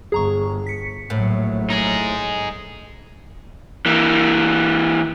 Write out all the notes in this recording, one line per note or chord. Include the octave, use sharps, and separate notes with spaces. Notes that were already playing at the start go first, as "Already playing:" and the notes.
G1 G#4 A#5 C#6
B6 C#7
A#1 A2 F#3
D#4 G#4 A#6
E3 A#3